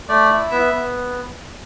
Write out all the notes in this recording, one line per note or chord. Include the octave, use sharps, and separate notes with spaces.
A3 D5
E4
B3 E5
B3